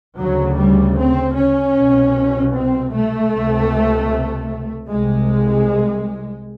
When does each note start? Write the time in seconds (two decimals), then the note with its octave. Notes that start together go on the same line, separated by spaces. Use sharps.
0.17 D2 C#3 F#3
0.57 G3
0.96 C4
1.35 C#4
1.74 C2 B2
2.52 C4
2.92 A3
3.31 C#2 C3
4.88 C2 C3 G#3